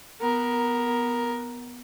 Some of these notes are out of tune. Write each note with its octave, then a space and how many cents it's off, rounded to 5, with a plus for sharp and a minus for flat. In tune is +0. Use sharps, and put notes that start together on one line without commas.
B3 +0 A#4 +10